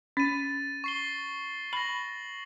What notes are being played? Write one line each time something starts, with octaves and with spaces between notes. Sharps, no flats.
C#4 A6 D#7
C#6 C7 G7
B5 A#6 F#7